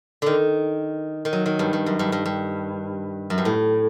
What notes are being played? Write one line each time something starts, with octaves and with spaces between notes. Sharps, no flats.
D3 D#3
D#3
F#3
D#3
G2
G2
F#2
G2
G2
G2
F#2
G2
A2